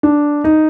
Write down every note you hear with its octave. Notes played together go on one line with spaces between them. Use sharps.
D4
D#4